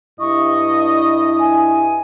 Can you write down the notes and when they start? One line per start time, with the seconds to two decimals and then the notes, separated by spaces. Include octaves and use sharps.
0.20 G2 E4 D#5 C#6
1.39 G#5